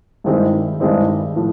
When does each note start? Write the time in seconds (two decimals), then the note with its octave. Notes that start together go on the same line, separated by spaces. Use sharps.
0.24 G2 D#3 G#3 C4 E4
0.80 G2 D#3 G#3 C4 E4
1.36 A2 F3